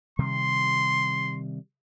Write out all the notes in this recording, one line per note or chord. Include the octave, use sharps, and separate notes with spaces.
C3 D#3 G3 C6